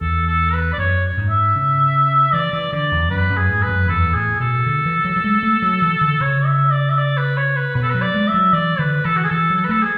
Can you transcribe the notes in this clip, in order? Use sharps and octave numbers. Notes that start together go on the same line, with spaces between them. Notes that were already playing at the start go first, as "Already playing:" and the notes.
E2 A4
A4
B4
D5
F#2 C#5
G#2
E5
C#3
E3 D5
E3
D3 D5
E2
F#2 B4
F#2
G#4
G#2
B4
F#2
E2 A4
A2 G#4
B2 A4
D3
E3
F#3
F#3
G#3
A3
F#3
E3
D3
C#3 C#5
E5
D5
E5
D5
B4
C#5
B4
B2 B4
A4
F#3 B4
D5
G#3
E5
F#3
E3 D5
D3 B4
E3 A4
F#4
G#4
E3 A4
F#3
A4
B4
A3 A4
G#4